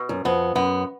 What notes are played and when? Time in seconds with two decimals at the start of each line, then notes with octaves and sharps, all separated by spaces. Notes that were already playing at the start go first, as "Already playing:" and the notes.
Already playing: B2
0.09 F#2
0.25 F2 B3
0.55 F#2 B3